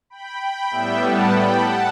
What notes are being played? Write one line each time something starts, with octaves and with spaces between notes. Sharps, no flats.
G5 B5
G5 B5
A2 G3 B3 E5 G5
F#5 A5
G5 B5
F#5 A5